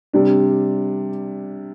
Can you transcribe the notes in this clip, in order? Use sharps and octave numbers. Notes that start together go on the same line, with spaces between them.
C3 G3 D4